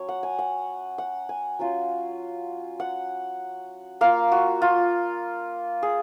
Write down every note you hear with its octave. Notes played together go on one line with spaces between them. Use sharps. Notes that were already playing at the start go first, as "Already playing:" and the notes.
Already playing: F#3 C#4 C#5
F#5
G#5
F#5
F#5
G#5
F#3 C#4 F4
F#5
A#3 F4 F5
F#4
F4
G#4